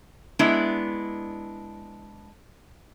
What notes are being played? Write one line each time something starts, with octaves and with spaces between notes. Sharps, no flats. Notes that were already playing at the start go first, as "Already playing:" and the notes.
G#3 B3 D4 E4